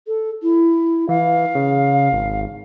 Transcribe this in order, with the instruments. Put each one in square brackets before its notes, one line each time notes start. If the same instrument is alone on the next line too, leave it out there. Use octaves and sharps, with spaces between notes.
[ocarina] A4
E4
[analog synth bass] E3 [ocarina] F5
[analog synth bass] C#3
G#1